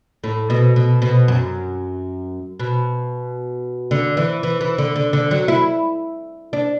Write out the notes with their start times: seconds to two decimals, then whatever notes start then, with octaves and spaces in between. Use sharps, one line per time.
0.24 A2
0.50 B2
0.76 B2
1.02 B2
1.28 F#2
2.60 B2
3.91 D3
4.17 E3
4.43 E3
4.61 E3
4.78 D3
4.96 D3
5.13 D3
5.31 F#3
5.48 E4
6.53 D4